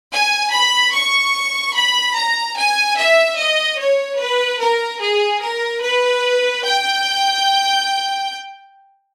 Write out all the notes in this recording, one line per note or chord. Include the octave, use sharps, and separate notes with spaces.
G#5
B5
C#6
B5
A#5
G#5
E5
D#5
C#5
B4
A#4
G#4
A#4
B4
G5